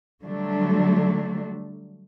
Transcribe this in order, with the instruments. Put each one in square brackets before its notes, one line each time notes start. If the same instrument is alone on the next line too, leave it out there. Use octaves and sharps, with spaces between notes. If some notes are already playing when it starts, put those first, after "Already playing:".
[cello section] D3 F#3 G3 A3 D4